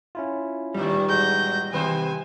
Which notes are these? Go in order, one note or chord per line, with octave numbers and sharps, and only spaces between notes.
C#4 E4 F4
E2 A2 D#3 G3
G#3 F#4 G6 A#6
C3 D#3 B4 C5 G5 G#5